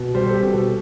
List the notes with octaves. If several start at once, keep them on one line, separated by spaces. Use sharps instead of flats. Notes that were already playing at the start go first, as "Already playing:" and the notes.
Already playing: B2
G3 C5
A4
G4
B2
A4